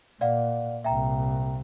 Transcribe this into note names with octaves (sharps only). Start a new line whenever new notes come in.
A#2 D5 F5 F#5
C2 A#2 E5 G5 A#5